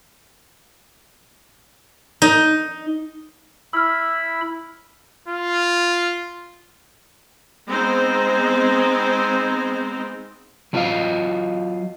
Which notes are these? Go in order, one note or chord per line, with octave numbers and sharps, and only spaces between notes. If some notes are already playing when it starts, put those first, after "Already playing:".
D#4
E4 B5 E6 F6
F4
G#3 B3 C4 D#4 C5
F#3 D4 F4 F#4 D#5 F5